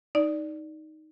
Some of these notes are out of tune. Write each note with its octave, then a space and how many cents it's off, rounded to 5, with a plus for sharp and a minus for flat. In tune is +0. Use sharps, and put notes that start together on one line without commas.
D#4 +0 D5 +0